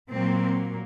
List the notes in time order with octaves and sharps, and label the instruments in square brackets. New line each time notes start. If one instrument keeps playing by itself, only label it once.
[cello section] A#2 F#3 A#3 C4